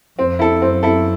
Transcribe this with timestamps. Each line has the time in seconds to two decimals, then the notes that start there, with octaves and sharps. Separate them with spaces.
0.18 F2 C4
0.39 E4 A4
0.62 F#2 C4
0.83 E4 A4